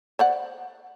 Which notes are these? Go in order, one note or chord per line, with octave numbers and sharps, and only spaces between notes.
C5 D5 F#5